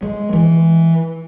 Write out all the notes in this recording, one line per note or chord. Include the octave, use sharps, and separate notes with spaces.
G#3
E3